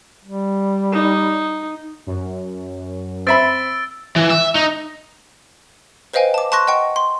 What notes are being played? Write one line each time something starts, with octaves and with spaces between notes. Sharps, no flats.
G3
D#4
F#2
C4 E5 B5 E6 A6 D7
E3
E5
D#4
B4 C5 D#5 F5 G5 G#5
A5 D6
A5 C6 C#6 F#6 A#6
D#5 F#5 G5 C#6
C6